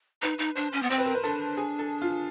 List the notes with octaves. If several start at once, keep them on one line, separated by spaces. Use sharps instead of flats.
D#4 B4
D#4
D4 C5
C#4
B3
C4 C5
B4
A#4
B4
D4 A4
G#4
A4
F4